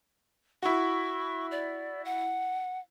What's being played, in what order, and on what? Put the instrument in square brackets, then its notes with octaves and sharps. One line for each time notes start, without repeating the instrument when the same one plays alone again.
[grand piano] E4 F#4 [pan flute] C#6
[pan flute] D5
F#5